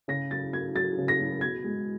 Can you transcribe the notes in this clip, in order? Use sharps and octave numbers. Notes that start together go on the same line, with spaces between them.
C#3 A#6
F#3 A6
F#3 G#6
F#3 A6
C#3
A#6
F#3
B2 G#6
G#3